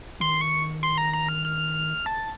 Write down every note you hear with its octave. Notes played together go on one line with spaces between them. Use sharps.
D#3 C6
C#6
C6
A#5
A#5
F6
F6
A5